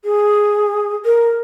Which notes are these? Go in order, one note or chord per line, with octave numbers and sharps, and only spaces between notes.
G#4
A#4